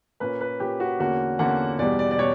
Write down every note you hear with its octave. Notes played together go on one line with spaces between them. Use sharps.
A#2 A#3 C#4 B4
B4
A#2 A#3 C#4 G4
F#4
E2 D3 A#3 C#4 F#4
E2 D3 A#3 C#4 F#5
E2 B2 G3 D5
D5
D5
B2 G3 C#5